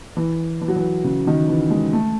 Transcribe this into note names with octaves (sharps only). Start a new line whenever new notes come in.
E3
E3
F#3
E3
C#3
D#3
E3
G#3
A3